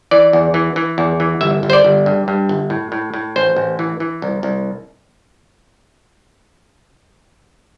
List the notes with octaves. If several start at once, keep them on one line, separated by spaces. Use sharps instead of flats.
E3 D5
E2
E3
E3
E2
E3
G1 E5
G1
C5
D5
G1
G2
G2
G1
A2
A2
A2
A1 C5
A1
E3
E3
C2
C2